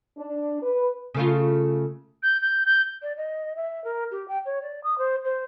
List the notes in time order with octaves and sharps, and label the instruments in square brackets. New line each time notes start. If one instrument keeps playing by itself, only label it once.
[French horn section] D4
B4
[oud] C#3 A3 F4
[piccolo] G6
G6
G6
[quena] D5
D#5
E5
A#4
G4
G5
C#5
D5
D#6
C5
C5